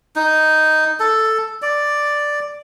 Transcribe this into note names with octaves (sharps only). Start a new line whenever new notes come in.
D#4
A4
D5